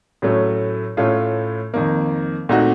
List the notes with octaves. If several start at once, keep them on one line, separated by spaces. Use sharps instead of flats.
A2 F#3 A3 C#4
A2 A3 C#4 F4
F2 D#3 A#3
A#2 A3 C4 D#4 F#4